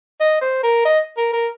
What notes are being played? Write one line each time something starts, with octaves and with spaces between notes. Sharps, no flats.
D#5
C5
A#4
D#5
A#4
A#4